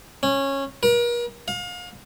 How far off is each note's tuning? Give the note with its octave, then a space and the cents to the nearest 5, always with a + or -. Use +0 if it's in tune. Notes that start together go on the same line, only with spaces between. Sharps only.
C#4 -15
A#4 +40
F5 +35